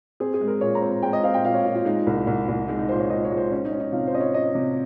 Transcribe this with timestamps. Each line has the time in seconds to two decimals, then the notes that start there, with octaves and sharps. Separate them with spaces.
0.20 C4 G#4
0.34 G#4
0.41 G#3
0.48 A#4
0.61 A#2 C#5
0.75 A#5
0.81 C4
1.03 G#3 G5
1.13 D#5
1.23 C4 F5
1.34 G5
1.44 A#2 F5
1.54 C#5
1.65 A#2 F4
1.75 F4
1.85 G#3 D#4
2.07 C2
2.27 C2
2.48 C2
2.68 G#3 D#4
2.79 D#4
2.89 A#2 C5
3.00 C#5
3.09 A#2 D#5
3.24 C#5
3.31 G#3
3.37 C5
3.51 C#4
3.65 D#4
3.72 C#4
3.80 D#4
3.92 C3 F4
4.07 C5
4.14 C#4 D#5
4.20 C#5
4.34 C#4 D#5
4.55 C3